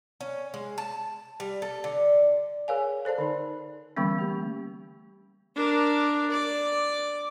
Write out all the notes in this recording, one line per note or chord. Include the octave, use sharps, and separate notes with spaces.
C#4
G#3
A5
G3
A4
D3
G#4 A#4 C#5 F5 G#5
A4 C5 D5 A5
D3 D#4
D3 E3 G3 A#3 B3 C#4
A3 G4
D4 A#4
D5